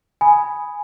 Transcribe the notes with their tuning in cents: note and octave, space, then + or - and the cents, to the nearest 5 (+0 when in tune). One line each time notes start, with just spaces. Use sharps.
G#5 +0 B5 +0 D#6 +0